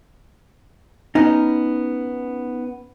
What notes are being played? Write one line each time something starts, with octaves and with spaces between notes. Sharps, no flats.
B3 C#4 D#4